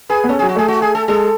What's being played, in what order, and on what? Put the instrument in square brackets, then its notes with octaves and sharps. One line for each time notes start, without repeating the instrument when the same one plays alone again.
[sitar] G#4 [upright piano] B4
[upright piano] B3
[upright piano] C#4 [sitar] A4
[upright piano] F#3 [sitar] G#4
[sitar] F#4
[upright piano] A3 [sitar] G#4
[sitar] F#4
G#4
A4
[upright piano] G#3 [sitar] A4